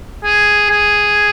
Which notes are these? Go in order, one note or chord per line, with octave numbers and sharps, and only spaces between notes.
G#4
G#4